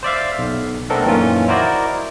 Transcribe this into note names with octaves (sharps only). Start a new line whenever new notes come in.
C5 D5 E5 F5
B1
A3 B3 C4 D4 A4 A#4
F#2 A#2 D#3 E3 C#4 F4
E4 F#4 A#4 C5 D5 D#5